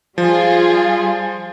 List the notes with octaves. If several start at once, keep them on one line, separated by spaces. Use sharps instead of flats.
F3 G3 F4 G#4